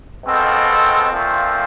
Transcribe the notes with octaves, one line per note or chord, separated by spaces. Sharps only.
B2 G#3 C4 F4 A4
A#2 F3 A3 C4 F4